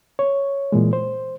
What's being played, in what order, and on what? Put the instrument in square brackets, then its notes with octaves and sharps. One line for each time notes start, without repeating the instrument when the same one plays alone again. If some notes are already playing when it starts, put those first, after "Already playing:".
[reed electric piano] C#5
A#2 E3 G#3
C5